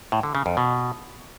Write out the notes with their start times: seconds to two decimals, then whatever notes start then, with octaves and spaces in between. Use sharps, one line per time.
0.12 A2
0.23 D3
0.35 C#3
0.46 F2
0.57 B2